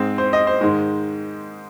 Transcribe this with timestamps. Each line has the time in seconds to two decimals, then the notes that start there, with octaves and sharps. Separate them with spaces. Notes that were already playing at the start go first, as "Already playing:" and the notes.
Already playing: G#2 G#3 C4
0.18 C5
0.33 D#5
0.47 C5
0.61 G#2 D#3 G#3